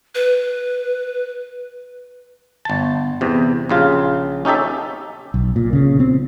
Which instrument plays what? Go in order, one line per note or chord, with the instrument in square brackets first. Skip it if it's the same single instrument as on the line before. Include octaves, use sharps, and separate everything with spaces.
[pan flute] B4
[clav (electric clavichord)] G1 A5
E2 C3
A#1 C#3 F4
C#4 D#4 G4 A4 E5
[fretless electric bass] B1
A#2
C#3
C4